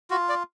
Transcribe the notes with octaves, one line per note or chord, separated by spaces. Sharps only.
F4 F#4
D5